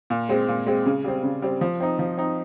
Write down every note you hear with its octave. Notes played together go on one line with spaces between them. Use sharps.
A#2
G#3 C4
A#2
G#3 C4
C#3
G3 C4
C#3
G3 C4
F3
C4 D#4
F3
C4 D#4